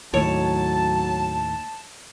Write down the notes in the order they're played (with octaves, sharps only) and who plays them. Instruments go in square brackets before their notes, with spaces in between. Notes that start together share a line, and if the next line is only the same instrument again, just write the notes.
[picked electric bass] D#2 A2 [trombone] F#3 [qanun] C#5 [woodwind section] A5